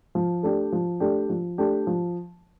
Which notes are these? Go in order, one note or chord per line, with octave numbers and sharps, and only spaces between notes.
F3
A3 D4 G4
F3
A3 D4 G4
F3
A3 D4 G4
F3